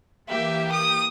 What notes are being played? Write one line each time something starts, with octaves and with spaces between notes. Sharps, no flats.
E3 A#3 G4 E5
D#6